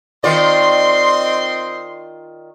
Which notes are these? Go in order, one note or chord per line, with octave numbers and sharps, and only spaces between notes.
D#3 C4 F4 D5 D#5 C6